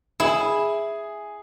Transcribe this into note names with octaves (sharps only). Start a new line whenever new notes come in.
E4 G#4 G#5